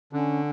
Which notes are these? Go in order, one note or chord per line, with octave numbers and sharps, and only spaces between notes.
D3 C#4